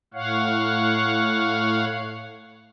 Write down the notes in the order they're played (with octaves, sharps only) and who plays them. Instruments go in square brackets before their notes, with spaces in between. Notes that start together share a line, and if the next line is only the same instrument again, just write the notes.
[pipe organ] A2 C#5 F5 F#5